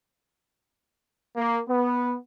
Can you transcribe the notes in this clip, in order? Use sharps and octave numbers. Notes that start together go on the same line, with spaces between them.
A#3
B3